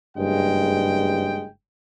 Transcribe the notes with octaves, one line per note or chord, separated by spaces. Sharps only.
F#1 G2 G#3 G5